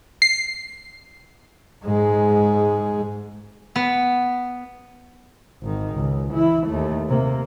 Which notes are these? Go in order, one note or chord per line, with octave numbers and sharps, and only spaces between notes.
C7
G#2 G#3
B3
G#1 D#3
C#2
E3 E4
D#2 A3
C3 A#3